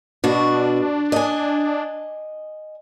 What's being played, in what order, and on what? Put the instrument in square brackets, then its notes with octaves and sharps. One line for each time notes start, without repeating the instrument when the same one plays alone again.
[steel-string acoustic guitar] B2 F#4 [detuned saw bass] D4
[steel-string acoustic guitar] D#5 G#5